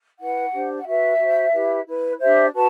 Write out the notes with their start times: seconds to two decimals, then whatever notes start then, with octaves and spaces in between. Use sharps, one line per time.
0.19 E4 B4 F#5
0.52 D4 G4 C5
0.79 F#5
0.86 F#4 B4 E5
1.19 F#4 C5
1.53 E4 G4 B4
1.87 E4 B4
2.20 D4 G4 C5 E5
2.54 F#4 B4 A5